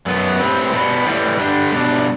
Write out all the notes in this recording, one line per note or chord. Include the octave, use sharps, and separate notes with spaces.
F#2 F#3 B3
A2 G3 C4 G4 B4
B2 G3 B3
A2 E3 G3
D3 G3 D4 G4
B2 G3 D4